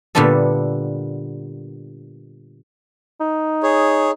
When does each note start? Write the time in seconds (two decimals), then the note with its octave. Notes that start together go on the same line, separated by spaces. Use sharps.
0.15 A#2 D3 G3 B3 D4 A4
3.20 D#4
3.63 G#4 C#5